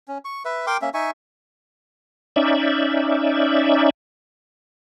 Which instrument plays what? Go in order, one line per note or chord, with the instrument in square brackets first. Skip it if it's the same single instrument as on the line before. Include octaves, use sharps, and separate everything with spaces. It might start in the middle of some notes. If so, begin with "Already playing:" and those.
[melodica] C#4
C#6
B4 E5
A#4 G5 C6 D6
A#3 C#4 E5
D#4 E5 G#5 C#6
[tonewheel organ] C#4 D#4 D5 E5